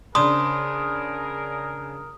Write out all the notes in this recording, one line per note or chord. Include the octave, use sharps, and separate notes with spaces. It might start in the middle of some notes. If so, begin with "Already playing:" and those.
C#3 D4 G#4 A#4 C5 D#6